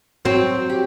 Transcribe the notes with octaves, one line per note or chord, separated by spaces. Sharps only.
F#3 C4
G4